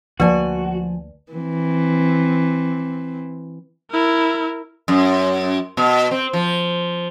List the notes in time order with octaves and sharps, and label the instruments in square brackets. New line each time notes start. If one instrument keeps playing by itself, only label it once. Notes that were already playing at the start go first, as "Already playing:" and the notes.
[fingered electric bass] D2 A#3 [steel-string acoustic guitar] F3 G#5 [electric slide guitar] F#4 [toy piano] B4 D5 A5
[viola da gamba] E3 C4
[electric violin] E4 A#4
[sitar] F#2
B2
C4
F3